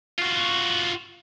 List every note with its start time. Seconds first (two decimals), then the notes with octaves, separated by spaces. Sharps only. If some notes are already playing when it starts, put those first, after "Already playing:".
0.19 F4 F#4